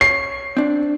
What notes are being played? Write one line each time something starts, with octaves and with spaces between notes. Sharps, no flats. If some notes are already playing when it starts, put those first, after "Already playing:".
C#5 C7
C4 D4